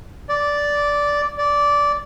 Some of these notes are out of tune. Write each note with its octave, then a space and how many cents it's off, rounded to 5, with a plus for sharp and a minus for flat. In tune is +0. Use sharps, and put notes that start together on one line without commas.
D5 -10
D5 -15